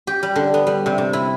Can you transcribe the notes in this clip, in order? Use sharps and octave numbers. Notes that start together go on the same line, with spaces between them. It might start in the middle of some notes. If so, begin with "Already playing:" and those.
G4
G3
D3
B3
G3
C3
C3
E4